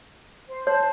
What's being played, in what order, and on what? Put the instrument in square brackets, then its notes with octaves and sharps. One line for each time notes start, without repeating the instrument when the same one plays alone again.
[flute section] C5
[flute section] C5 A5 [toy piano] C#5